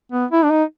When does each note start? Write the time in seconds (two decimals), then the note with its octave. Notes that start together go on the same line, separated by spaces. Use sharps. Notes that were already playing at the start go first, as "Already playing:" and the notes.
0.12 B3
0.31 E4
0.43 D4
0.50 D#4